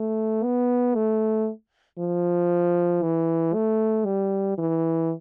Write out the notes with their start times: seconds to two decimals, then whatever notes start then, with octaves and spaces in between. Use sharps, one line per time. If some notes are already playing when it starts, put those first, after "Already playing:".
Already playing: A3
0.43 B3
0.95 A3
1.99 F3
3.02 E3
3.54 A3
4.05 G3
4.58 E3